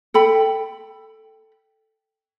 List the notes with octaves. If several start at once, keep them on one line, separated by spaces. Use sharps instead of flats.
A4 G5 B5